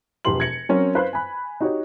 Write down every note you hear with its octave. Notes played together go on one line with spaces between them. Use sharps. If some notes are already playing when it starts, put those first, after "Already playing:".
E1 F3 G4 B4 C6 F#7
G#6 A#6 C#7 F#7
F#3 C4 C#4 A#4
B4 C5 F5 F#6
G#5 B5
D#4 F#4 G4 C#5